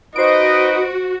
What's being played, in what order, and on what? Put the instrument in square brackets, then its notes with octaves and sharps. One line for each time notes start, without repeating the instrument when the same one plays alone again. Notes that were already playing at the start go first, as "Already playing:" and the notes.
[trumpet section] D#4 B4 D#5 [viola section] F#4 [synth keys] C5 D7